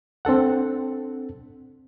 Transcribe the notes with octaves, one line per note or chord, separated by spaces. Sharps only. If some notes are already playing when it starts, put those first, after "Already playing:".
C4 D4 A4 F#5